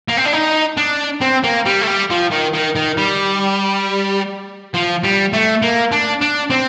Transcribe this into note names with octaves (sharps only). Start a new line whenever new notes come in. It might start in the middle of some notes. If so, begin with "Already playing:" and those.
A#3
C4
D4
D#4
D4
C4
A#3
G3
A3
G3
F3
D#3
D#3
D#3
G3
F3
G3
A3
A#3
D4
D4
C4